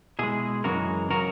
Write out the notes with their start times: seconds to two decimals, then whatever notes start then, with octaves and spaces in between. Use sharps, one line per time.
0.19 B2 G#3 E4 G#4
0.64 F#2 C#3 E3 G#3 F#4 A#4
1.11 C#3 F#3 F#4 A#4